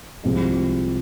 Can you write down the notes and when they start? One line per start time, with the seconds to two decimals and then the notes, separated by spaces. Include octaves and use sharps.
0.23 C2 C3 F3 G#3